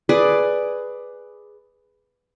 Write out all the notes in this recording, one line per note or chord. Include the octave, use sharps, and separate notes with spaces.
G#4 B4 D5